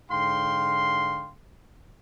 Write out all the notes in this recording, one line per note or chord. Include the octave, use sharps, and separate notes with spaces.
G#2 D3 F5 G5 C6